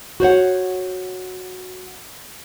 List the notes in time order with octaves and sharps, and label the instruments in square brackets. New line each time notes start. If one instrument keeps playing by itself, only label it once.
[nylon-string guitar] F#4 C5 C#5 F#5